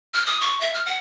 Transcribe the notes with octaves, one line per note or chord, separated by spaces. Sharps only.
F6
D#6
C#6
E5
F6
F#5